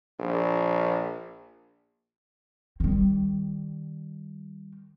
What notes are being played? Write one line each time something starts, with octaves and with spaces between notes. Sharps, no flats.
A#1
D#3 G3